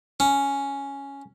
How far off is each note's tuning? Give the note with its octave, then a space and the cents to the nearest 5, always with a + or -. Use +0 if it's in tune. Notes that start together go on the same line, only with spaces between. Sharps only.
C#4 +5